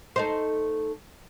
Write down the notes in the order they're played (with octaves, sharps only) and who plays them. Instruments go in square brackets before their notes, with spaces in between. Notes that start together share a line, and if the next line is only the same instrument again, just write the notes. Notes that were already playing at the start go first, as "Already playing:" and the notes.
[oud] A3 D#4 C5